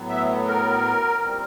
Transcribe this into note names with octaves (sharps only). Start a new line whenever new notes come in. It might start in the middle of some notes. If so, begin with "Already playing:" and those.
Already playing: A2 F#3 B3
E5
A#4
A#2 G3 C4